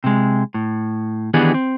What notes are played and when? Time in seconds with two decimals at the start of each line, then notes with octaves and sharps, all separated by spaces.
0.04 C3 G#3
0.54 A2
1.34 D#3 E3 B3 D4 G4 G#4
1.54 C4